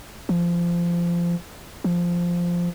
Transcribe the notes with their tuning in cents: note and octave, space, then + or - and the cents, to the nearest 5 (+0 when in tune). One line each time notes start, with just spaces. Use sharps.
F3 -20
F3 -5